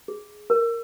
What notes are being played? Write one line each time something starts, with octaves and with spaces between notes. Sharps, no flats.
G#4
A#4